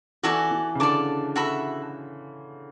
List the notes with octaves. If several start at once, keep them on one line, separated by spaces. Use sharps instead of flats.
E3 F#4 A4 D5 G#5
E3
C#3
D3 A4 D5 A5 D6
F#4 A4 E5 B5